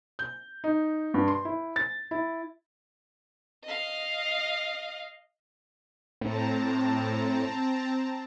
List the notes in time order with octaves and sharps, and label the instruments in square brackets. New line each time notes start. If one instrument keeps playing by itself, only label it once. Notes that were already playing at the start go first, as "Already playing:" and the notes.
[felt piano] G6
D#4
G2
C6
E4
A6
E4
[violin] D#5 F5
[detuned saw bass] A2 [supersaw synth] C4 A5 A#5